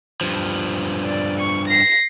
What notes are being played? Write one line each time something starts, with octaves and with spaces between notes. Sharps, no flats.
G2 F3
D5
C#6
A#6 C7